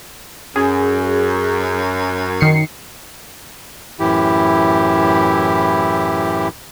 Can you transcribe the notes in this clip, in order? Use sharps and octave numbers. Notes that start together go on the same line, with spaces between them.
F#2 G#4
D#3 C7 C#7
F#2 A2 E3 E4 G4